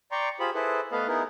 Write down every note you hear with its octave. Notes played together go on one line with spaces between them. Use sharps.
D5 G5 A#5 C6 C#6
F4 G4 G#4 C5 B5
E4 G#4 A4 B4 C5
A3 B3 A4 B4 D#5 F5
B3 D#4 E4 G#4 A#4